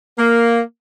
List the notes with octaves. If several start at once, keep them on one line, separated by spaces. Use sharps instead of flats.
A#3